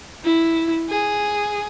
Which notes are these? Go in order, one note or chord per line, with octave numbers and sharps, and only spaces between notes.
E4
G#4